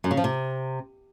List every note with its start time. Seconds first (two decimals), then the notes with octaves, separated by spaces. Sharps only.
0.04 F#2
0.11 C#3
0.17 F3
0.24 C3